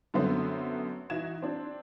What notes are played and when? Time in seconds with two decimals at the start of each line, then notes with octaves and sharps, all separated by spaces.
0.14 F#2 D3 A3 B3 C4
1.10 E3 D#4 F#4 G#6 E7
1.42 C4 D4